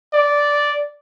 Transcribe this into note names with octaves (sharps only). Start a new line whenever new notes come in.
D5